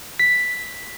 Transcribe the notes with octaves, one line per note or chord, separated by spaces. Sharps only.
B6